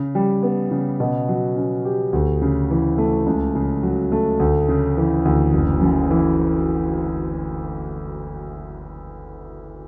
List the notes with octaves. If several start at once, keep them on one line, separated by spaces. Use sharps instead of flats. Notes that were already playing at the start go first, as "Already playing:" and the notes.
Already playing: C#3
G3
B3
C#3
B2
F#3
C#4
G4
D2
C#3
E3
A3
C#2
C#3
F#3
A3
D2
C#3
E3
D2
F#1
F#2
E3